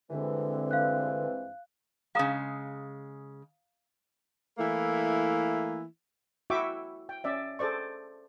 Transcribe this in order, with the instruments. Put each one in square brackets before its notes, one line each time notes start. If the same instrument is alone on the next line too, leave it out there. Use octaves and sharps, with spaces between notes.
[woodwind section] G2 E3 C4 [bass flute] D3 [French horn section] G#3 C5
[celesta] F5 F#6
[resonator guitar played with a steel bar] C#3 G#3 [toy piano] F5 A#5 D#6
[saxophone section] E3 A3 A#3 E4
[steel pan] E4 F#4 E5 G5 C#6 D6
G5
C#4 D5 E5
G#4 A4 C5 D5 C#6